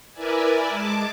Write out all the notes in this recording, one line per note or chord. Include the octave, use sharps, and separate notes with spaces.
E4 A#4 B4 D5 E5 G#5
G#3 A5 D6